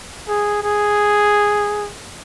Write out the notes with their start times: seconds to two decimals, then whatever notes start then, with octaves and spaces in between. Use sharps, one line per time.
0.28 G#4
0.63 G#4